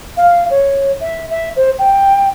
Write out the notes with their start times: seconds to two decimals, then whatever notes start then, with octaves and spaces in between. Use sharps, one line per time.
0.17 F5
0.50 C#5
1.00 E5
1.30 E5
1.56 C5
1.78 G5